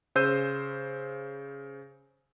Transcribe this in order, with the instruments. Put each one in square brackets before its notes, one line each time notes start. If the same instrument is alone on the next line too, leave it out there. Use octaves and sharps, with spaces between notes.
[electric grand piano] C#3 C5 E6 G6 D#7